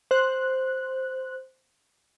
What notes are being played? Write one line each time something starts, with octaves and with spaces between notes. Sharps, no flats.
C5 F#6